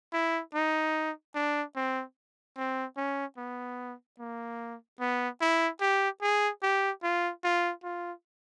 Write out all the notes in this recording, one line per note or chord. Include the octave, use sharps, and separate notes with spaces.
E4
D#4
D4
C4
C4
C#4
B3
A#3
B3
E4
G4
G#4
G4
F4
F4
F4